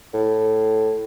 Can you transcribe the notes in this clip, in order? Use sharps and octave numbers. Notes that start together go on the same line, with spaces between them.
A2